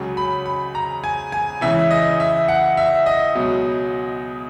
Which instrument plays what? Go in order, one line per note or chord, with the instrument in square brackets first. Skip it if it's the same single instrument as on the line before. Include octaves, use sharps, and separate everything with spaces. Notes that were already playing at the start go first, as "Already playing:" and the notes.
Already playing: [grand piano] C#2 C#3 F#3
B5
B5
A#5
G#5
G#5
C#2 C#3 E3 E5
D#5
E5
F#5
E5
D#5
C#2 B2 F#3